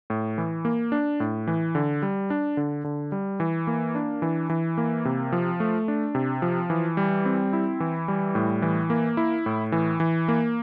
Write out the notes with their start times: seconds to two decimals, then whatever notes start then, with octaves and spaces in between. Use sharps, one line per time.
0.10 A2
0.38 E3
0.65 A#3
0.92 D4
1.20 A2
1.47 E3
1.75 D3
2.02 G3
2.30 D4
2.57 D3
2.84 D3
3.12 G3
3.40 E3
3.67 A#3
3.95 D4
4.22 E3
4.50 E3
4.78 A#3
5.05 C3
5.32 F3
5.60 A3
5.88 D4
6.15 C3
6.42 F3
6.70 E3
6.97 G3
7.26 C4
7.53 E4
7.80 E3
8.08 G3
8.35 A2
8.62 E3
8.90 A#3
9.17 E4
9.46 A2
9.72 E3
10.00 E3
10.28 A#3